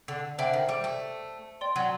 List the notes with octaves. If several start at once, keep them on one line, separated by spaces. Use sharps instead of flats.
D3
D3 C5 E5 G5
D#3
G3
A3
D5 G5 C6
F#3